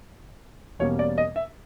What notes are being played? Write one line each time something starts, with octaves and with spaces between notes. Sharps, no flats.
E2 B2 G3 A#3 C#4 C#5
D5
D#5
E5